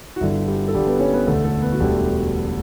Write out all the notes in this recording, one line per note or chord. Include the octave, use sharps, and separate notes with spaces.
F#4
G1 G2 D3 E4
G3 G4
A4
G1 G2 D3 G3 G4
B3 B4
C#4 C#5
B3 B4
E1 D2 D3 A3 A4
A3 A4
B3 B4
F#4
E1 D2 D3 G3 G4